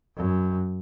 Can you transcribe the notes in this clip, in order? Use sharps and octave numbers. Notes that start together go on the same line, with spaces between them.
F#2